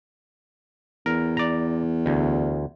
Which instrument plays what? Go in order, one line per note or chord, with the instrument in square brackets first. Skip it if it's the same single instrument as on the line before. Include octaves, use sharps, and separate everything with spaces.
[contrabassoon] E2 [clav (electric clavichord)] A#4
[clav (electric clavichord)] D5 A#5
D2